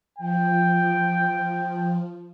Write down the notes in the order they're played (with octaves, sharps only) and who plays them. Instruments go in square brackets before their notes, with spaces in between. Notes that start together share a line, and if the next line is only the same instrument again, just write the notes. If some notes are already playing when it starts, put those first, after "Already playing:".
[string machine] F3 [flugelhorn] G5